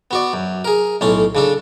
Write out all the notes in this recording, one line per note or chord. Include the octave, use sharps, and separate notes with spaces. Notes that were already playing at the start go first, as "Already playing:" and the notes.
B3 F#4 D5
F#2
G#4 A#4
B1 A2 C#4 C6
C#3 D4 A4